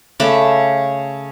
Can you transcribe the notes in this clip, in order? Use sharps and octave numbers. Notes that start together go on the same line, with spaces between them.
C#3 A3 B5 D6